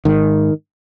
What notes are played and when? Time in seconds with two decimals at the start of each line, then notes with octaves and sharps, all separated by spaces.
0.05 G#2 D#3